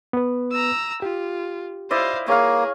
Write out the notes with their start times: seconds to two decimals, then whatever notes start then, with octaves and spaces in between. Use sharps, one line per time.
0.13 B3 B4
0.52 A#5 E6
1.02 F4 G4
1.91 E4 C5 D5 D#5 F5
2.28 A#3 G#4 C#5 F5